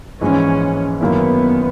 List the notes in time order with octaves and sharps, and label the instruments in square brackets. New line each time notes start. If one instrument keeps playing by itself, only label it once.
[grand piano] A#1 G#2 E3 G#3 [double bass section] C#4
[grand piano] F#2 D#3 A#3 C#4 E4 [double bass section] B3